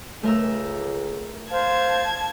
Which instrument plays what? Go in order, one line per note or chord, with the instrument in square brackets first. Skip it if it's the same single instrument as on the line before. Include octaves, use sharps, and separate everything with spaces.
[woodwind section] C#2 [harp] A3 A#4 E6
[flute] C5 [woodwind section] F5 [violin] A5 G#6